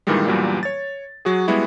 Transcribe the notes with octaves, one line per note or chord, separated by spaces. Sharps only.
G2 A#2 D#3 E3 G3 G#3
E2 G2 A#2 F#3 G3 A#3
C#5 A6
F#3 F#4 G#4
G3 G#3 B3 E4 F#4